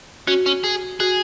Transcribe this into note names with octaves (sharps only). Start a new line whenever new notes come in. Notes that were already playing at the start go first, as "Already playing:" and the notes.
C#4 F#4
C#4
G#4
F#4 G#4